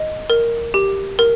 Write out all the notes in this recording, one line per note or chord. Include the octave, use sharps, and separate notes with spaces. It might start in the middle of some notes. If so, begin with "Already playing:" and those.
Already playing: D#5
A#4
G4
A#4